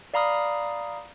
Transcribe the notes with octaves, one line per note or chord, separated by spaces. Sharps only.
D5 F5 A#5 B5 D#6 F6